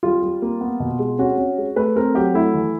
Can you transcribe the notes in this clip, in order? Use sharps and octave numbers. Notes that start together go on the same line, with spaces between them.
G3 F4
G3
A#3
B3
B2
G#3
C#4 F#4
C#4
G#3
A3 B4
C4 A#4
F#3 G4
A3 E4
E3